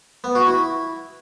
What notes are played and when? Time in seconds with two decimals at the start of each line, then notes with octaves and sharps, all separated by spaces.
0.24 B3
0.35 F#4
0.47 E4